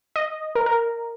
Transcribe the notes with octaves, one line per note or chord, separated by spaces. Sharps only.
D#5
A#4
A#4